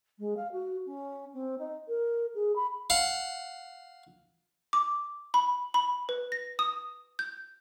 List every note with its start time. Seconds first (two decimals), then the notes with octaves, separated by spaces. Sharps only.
0.18 G#3
0.36 F5
0.52 F#4
0.85 C#4
1.33 C4
1.58 D#4
1.88 A#4
2.34 G#4
2.55 B5
2.90 F5 F#5
4.73 D6
5.34 B5
5.74 B5
6.09 B4
6.32 A#6
6.59 D#6
7.19 G6